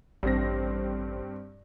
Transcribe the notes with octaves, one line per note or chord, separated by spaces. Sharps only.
A1 G2 C4 A#6